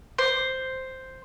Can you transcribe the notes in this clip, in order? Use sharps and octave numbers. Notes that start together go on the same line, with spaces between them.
C5